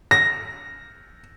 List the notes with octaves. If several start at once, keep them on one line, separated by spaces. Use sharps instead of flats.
A#6